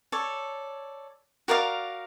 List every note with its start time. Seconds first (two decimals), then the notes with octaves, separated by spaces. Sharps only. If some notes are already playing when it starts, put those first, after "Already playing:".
0.12 A4 C#5 D5
1.48 F#4 A#4 D5 F5